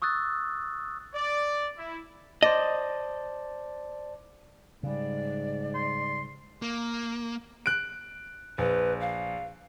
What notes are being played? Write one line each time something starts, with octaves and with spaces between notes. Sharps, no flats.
C#6 D#6 E6 F#6 A6
D5
E4
C5 D5 D#5 A5
G#2 C#3 G3 D5
C6
A#3
F#6 D7
A#1 B4
F5